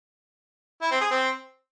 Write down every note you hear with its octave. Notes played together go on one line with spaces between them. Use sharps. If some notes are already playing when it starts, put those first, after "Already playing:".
E4
C4
G#4
C4